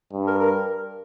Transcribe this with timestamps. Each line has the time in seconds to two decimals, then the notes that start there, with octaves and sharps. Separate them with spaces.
0.13 G2
0.27 A#4
0.40 A#4